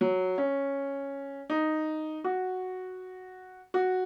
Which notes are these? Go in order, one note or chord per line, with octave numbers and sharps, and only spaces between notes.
F#3
C#4
D#4
F#4
F#4